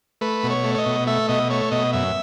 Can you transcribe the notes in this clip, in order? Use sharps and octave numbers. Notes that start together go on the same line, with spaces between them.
A3 B4
B2
C#5
A3
C#5
D#5
B2
A3 E5
B2 D#5
A3 C#5
B2 D#5
F#2 E5